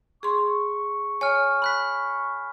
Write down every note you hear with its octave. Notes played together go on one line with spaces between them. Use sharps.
G#4 C6 C#6
C#5 G#5 F6
B5 F#6 B6